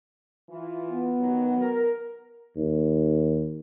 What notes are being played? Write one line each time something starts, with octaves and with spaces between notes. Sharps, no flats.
E3 F4
B3
D#3 F#3 F#4
A#4
D#2